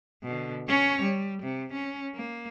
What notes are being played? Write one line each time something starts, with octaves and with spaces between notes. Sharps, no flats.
B2 D3
C#4 C#5
G3
C3
C#4
A#3